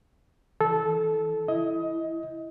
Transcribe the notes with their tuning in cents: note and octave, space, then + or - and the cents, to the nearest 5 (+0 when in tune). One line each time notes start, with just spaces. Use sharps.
E3 +0 A4 -15
E4 +5 D#5 +20